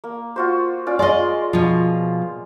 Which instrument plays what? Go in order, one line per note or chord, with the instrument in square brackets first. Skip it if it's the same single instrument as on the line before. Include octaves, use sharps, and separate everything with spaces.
[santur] A#3
F4 F#4 C5
C#4 F4 D5
[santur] G#3 C6 [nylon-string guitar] D5 D#5
[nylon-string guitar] B2 F3